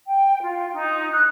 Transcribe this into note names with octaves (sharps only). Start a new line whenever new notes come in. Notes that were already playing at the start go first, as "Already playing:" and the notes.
G5
F4
D#4
F#6